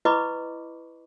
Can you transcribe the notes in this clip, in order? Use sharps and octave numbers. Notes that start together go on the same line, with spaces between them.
E4 B4 D#5 B5 C#6 D6